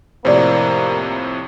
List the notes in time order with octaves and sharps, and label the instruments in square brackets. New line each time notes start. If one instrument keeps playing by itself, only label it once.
[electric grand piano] F2 A2 C3 [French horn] A#3 [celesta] C5 D5